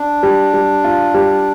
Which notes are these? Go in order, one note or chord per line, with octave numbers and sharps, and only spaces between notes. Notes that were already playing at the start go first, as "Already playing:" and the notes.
Already playing: D4
G3
G3
F4
G3